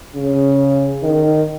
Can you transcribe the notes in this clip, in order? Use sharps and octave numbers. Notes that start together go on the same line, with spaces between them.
C#3
D#3